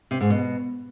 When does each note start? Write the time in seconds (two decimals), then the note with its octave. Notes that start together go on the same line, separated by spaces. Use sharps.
0.11 C3
0.20 G#2
0.30 B2